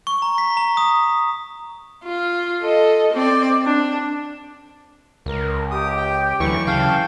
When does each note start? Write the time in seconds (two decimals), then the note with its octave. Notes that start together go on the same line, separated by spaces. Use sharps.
0.07 C#6
0.22 A#5
0.38 B6
0.57 A#5
0.77 D#6
2.04 F4
2.62 A4 D#5
3.13 C4 D5
3.65 D4
5.26 C#2 A#4
5.71 G4 D#6
5.97 G5
6.40 D2 E3 F#3 C#6
6.67 C#3 F5 G5 A5